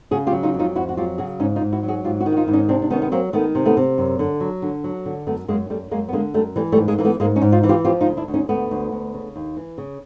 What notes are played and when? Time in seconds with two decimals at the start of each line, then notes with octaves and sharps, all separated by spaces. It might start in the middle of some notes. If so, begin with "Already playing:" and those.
0.11 C#3 F#4 G#4
0.27 F4 G4
0.33 F#3
0.43 D#4 F4
0.54 F2
0.59 D#4 F4
0.75 F2 E4 F#4
0.89 F#4
0.97 F#3 F4 G4
1.18 C#3 F#4 G#4
1.40 G#2 C#4 D#4
1.56 D#4 F4
1.61 G#2
1.72 E4 F#4
1.83 F#3
1.88 F#4 G#4
2.04 G#2 F4 G4
2.20 E4 F#4
2.26 D#3
2.32 F#4
2.37 D#4 F4
2.47 G#2 E4
2.53 C#4 D#4
2.68 C3 C4 D4
2.82 D4
2.90 D#3 B3 C#4
3.02 B3
3.12 F#3 A#3 C4
3.33 D#3 A3 B3
3.55 C3
3.65 A3 B3
3.77 C3
3.98 F#2
4.19 D3
4.40 F#3
4.62 D3
4.84 F#3
5.06 D3
5.27 F#2 A3 B3
5.48 F#2 G#3 A#3
5.70 F#2 G3 A3
5.91 F#2 G#3 A#3
6.08 B3
6.13 D3 G#3 A#3
6.34 F#2 G3 A3
6.56 E3 G3 A3
6.72 G3 A3
6.78 G#2
6.88 G#3 A#3
6.99 E3 A#3
7.05 A3 B3
7.20 G#2 G#3 A#3
7.36 C#4 D#4
7.42 G#2
7.52 D#4 F4
7.63 E3
7.69 F4 G4
7.85 F3 F4 G4
8.01 D#4 F4
8.06 D2
8.17 D4 E4
8.28 D2
8.34 C#4 D#4
8.49 D2 A3 B3
8.71 D2
8.92 D2
9.14 C#3
9.36 D#2
9.57 E3
9.78 C#3